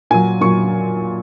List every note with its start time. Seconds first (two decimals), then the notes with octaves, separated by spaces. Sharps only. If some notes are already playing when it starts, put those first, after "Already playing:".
0.11 A#2 F#3 G#5
0.41 A#2 F#3 C#6